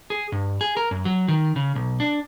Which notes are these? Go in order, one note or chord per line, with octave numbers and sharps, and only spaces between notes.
G#4
G2
G#4
A#4
F#2
F#3
D#3
C#3
B1
D4